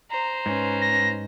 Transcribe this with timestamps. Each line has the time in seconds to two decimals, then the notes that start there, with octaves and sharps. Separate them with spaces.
0.11 C5 A#5
0.46 G#2 C#4 B4
0.82 A#6